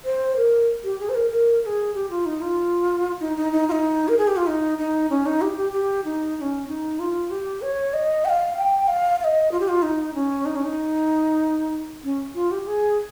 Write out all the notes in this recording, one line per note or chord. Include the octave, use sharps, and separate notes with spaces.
C5
A#4
G4
G#4
C5
A#4
A#4
A#4
G#4
G4
F4
D#4
F4
D#4
D#4
D#4
F4
D#4
A#4
G#4
G4
F4
D#4
D#4
C#4
D#4
G4
G4
G4
D#4
D#4
C#4
D#4
F4
G4
C#5
D#5
G5
F5
G5
F5
F5
D#5
F4
G4
F4
D#4
C#4
D#4
C#4
D#4
C#4
F4
G4
G#4